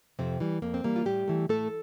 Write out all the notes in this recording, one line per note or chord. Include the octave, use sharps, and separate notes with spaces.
F2 C3 C4
E3 G3
F2 A#3
C4
E3 G3 A#3
F4
A2 G3 G4
E3 A3
A2 A3 A4